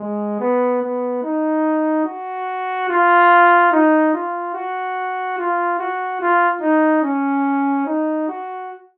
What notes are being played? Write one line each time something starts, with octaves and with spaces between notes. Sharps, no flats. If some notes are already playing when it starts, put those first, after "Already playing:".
Already playing: G#3
B3
B3
D#4
F#4
F4
D#4
F4
F#4
F4
F#4
F4
D#4
C#4
D#4
F#4